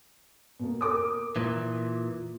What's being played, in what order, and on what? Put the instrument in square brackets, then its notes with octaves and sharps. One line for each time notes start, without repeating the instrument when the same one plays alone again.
[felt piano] B2 A#3
A#4 D6 D#6
[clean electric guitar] A#2 E3